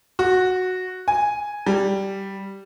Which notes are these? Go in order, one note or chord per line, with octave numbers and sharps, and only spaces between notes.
F#4
G#5
G3